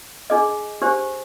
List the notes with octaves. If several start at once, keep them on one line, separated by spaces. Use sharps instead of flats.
D4 G#4 D#5
D4 G4 C5